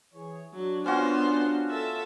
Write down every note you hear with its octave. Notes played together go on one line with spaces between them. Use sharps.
E3 G#4 C#5
F#3 D4
B3 C#4 F4 F#4 C5
A4 E5